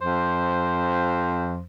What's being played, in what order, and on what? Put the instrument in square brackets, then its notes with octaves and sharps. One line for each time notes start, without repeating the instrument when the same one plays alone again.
[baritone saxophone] F2 [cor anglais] C5